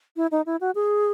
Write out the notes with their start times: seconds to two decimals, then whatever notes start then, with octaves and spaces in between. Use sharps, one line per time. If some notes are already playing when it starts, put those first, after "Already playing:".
0.16 E4
0.31 D#4
0.46 E4
0.61 F#4
0.75 G#4